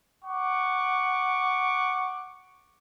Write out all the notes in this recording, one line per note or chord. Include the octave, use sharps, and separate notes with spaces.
F#5 C#6 D6